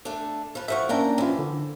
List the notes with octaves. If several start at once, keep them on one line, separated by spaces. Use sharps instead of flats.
A3 D4
F3 B4
A2 F3 E5 F#5 C#6
A#3 C#4 D4 E4 G5 A#5
E3 F3 C#4 F4
D3